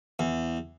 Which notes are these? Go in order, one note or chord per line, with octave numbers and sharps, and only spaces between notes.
E2